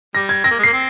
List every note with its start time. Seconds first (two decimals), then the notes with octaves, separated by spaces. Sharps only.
0.15 G3 A#6
0.29 G#6
0.44 C4 A#6
0.51 A#3
0.59 G#3
0.63 A#3 C7
0.73 C4